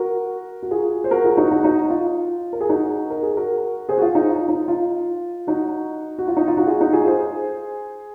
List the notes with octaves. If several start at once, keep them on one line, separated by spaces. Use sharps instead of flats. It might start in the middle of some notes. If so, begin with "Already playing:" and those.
Already playing: F#4 A#4
F#4
F4 G#4
C5
F#4 A#4
F4 G#4
D#4 F#4
D#4 F#4
D#4 F#4
F4
A#4
G#4
D#4 F#4
A#4
G#4
F#4 A#4
G#4 C5
F#4
F4
D#4
F4
D#4
F4
D#4 F#4
F#4
F4
D#4
F4
D#4 F#4
F4 G#4
D#4 F#4
F4 G#4
G#4 C5